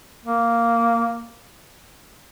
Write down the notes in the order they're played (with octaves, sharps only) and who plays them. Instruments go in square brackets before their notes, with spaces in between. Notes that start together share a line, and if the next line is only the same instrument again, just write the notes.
[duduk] A#3